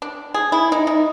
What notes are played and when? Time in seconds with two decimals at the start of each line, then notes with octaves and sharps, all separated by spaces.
0.02 D4
0.34 G#4
0.52 E4
0.72 D#4
0.87 D#4